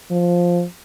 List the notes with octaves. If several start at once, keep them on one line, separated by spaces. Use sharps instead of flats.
F3